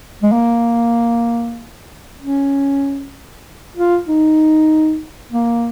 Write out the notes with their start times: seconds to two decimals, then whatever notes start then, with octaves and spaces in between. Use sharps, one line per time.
0.23 G#3
0.32 A#3
2.20 C#4
3.76 F4
4.08 D#4
5.32 A#3